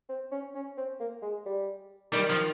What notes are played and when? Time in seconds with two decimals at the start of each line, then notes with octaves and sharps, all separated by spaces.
0.09 C4
0.31 C#4
0.55 C#4
0.77 C4
1.00 A#3
1.22 G#3
1.46 G3
2.12 D#3 G3
2.30 F3